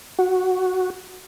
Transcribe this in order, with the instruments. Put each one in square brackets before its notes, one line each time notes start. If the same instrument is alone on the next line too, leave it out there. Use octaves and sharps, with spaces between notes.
[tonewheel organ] F#4